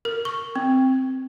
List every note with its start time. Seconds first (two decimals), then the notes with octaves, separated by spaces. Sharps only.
0.05 A#4
0.25 C#6
0.56 C4